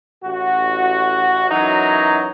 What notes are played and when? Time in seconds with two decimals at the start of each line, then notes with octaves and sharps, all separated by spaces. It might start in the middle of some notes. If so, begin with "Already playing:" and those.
0.23 A1 F#4
1.50 F#2 E3 F#3 D#4